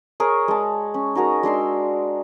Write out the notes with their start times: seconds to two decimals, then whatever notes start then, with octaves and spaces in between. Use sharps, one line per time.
0.20 G#4 A#4 C#5
0.48 G#3 A5
0.94 C#4
1.15 D#4 F#4 G#4 A#4
1.43 G#3 D4 C6 E6